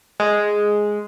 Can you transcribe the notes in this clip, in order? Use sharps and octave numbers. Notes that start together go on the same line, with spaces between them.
G#3